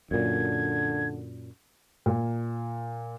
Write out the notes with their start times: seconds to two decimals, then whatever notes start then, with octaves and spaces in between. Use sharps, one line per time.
0.11 F#2 A#2 D3 G#6
2.06 A#2